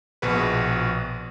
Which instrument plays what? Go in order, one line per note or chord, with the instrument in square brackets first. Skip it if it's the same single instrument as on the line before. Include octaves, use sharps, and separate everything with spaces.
[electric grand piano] A#1 B2 F#4 G#4 B4